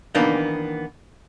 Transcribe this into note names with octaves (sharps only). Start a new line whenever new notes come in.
D#3 E3 A#3 B3 D4 D#4